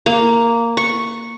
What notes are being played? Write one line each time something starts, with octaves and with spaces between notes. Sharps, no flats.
A#3
C#6